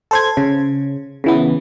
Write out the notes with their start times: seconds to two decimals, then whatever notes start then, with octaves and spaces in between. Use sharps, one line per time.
0.11 A4 C5 G#6
0.37 C#3
1.24 C#3 E3 B3